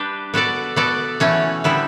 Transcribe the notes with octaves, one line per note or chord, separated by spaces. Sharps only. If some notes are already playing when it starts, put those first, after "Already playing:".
Already playing: G3 D4 G4 B4
B3 F#4 A4 D5
B3 F#4 A4 D5
E3 A3 C#4 F#4 C#5
D3 G3 B3 E4